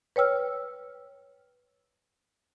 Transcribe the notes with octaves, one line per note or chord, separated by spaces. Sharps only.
B4 C#5 G5 E6 F6